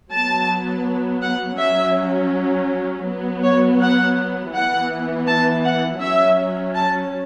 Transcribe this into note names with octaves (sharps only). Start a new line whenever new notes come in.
F#3 B3 A5
F#5
F#3 C#4 E5
F#3 B3
C#5
F#5
E3 B3 F#5
A5
F#5
F#3 C#4 E5
A5